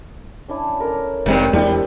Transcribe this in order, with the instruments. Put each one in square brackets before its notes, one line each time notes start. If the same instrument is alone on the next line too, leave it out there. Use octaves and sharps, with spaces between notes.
[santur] C#4 D4 E4
C#4 A4 A#4
[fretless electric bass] F1 G#3 C4 [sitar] G2 C3 D#3
[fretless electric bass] E2 [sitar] G3 [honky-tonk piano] G#3 D4 E4 [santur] C5